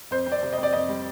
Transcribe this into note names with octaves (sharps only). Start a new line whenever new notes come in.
F2 C5
C4
D5
C3
D#5
C4 D5
F2 D#5
G3